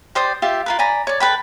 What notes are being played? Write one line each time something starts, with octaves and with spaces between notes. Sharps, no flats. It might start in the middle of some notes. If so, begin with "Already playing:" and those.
G4 C5 D5 D#6
F4 G4 E5 F5
F4 A#4 B4
D5 G#5 A#5 B5
C#5 D5
A4 B4 G5 B5